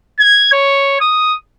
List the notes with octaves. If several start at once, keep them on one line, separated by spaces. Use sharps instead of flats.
G#6
C#5
D#6